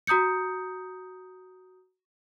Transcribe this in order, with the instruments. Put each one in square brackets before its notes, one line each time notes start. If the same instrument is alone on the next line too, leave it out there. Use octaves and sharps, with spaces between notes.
[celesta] F#4 A#5 D#6 G6 C#7